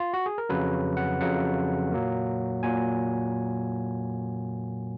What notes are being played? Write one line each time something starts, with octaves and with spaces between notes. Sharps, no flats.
F4
F#4
G#4
A#4
F2 C#3 F#3 B4
F#5
F2 C#3 F#3 F#5
A#2 F#3 A#3
A#2 F#3 A#3 G#5